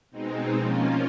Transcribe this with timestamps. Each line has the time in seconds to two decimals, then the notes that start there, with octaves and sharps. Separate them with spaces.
0.11 B2 G#3 C4 D#4
0.55 F3 A#3 C#4 F4